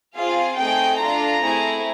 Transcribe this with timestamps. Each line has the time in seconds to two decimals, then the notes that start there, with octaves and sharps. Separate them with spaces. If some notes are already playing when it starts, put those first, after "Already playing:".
0.16 C4 F4 G#4 F5
0.58 A3 C4 D#4 G#4 G5
1.00 D4 F4 A4 A#5
1.42 A3 C4 E4 G#4